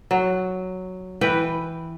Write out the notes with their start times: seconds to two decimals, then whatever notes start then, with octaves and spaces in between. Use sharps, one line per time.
0.11 F#3
1.21 E3 B4 G5